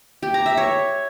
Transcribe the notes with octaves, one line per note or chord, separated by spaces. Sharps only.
G4
A#5
E5
C#5